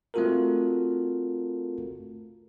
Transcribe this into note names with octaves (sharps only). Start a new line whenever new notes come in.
A3 C4 F4 F#4 A4 A#4